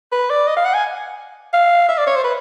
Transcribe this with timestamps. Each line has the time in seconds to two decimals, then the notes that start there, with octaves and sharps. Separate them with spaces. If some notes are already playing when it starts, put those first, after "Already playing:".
0.12 B4
0.30 D5
0.47 D#5
0.57 F5
0.65 F#5
0.74 G#5
1.53 F5
1.89 E5
1.98 D5
2.07 C#5
2.15 C5
2.24 B4